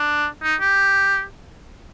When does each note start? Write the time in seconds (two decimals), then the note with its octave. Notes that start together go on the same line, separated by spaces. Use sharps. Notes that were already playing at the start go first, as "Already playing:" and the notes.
Already playing: D4
0.43 D#4
0.61 G4